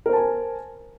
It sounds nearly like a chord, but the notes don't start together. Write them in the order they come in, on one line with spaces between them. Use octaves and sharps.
A#4 C5 A5 G#5